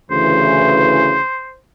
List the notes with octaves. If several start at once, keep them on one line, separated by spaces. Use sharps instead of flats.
D2 C#3 E3 C5